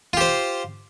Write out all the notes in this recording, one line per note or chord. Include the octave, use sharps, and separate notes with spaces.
F4 G4 C5